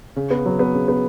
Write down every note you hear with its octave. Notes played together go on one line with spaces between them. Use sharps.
C#3
B3
F#3
B3
C#3
B3